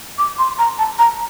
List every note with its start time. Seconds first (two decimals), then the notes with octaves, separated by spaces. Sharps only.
0.18 D6
0.39 C6
0.59 A#5
0.79 A5
0.99 A#5